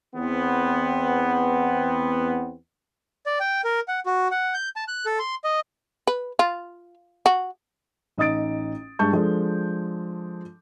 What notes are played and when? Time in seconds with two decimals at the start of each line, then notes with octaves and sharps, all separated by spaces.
0.15 E2 B3 C4
3.26 D5
3.40 G5
3.64 A#4
3.88 F#5
4.06 F#4
4.31 F#5
4.54 G6
4.76 A5
4.88 F#6
5.06 A4
5.19 C6
5.44 D#5
6.07 B4
6.39 F4
7.26 F#4
8.18 A1 D#4 D#5 D#6 A6 D7
8.99 G2 G#3 A5 C#6 G6
9.13 F3 G#3 D4 A4